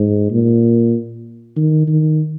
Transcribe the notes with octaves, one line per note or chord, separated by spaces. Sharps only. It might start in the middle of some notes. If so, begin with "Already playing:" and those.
Already playing: G#2
A#2
D#3
D#3